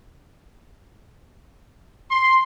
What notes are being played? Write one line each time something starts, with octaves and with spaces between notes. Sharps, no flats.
C6